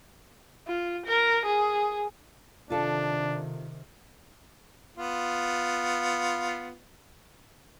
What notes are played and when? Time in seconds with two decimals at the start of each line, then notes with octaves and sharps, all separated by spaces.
0.68 F4
1.06 A#4
1.46 G#4
2.70 C3 D#3 D4 F4 A4
4.97 B3 F4